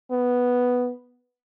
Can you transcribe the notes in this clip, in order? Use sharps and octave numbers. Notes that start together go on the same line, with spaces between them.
B3